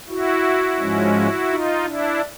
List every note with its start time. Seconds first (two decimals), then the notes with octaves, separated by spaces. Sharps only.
0.09 E4 F#4
0.79 G#2 F3 G#3 C#4
1.49 D#4 F4
1.84 D4 E4